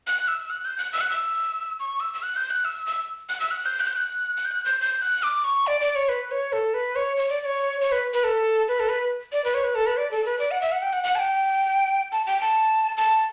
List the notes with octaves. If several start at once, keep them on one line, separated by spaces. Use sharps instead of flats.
F#6
E6
F#6
G6
F#6
E6
F#6
E6
C#6
E6
E6
F#6
G6
F#6
E6
E6
F#6
E6
F#6
G6
F#6
G6
F#6
F#6
G6
F#6
G6
G6
F#6
D6
C#6
D5
D5
C#5
B4
C#5
A4
B4
C#5
C#5
D5
D5
C#5
C#5
B4
B4
A4
B4
A4
B4
D5
B4
C#5
B4
A4
B4
D5
A4
B4
D5
F#5
E5
F#5
G5
F#5
F#5
A5
G5
A5
G5
A5
A5